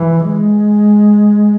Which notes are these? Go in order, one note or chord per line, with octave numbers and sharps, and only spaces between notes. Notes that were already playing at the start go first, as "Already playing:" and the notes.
Already playing: E3
G#3